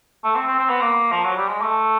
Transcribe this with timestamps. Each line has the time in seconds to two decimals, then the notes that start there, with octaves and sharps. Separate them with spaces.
0.24 A3
0.35 C4
0.47 C4
0.58 C4
0.70 B3
0.81 A#3
1.12 F3
1.24 F#3
1.36 G3
1.48 G#3
1.61 A3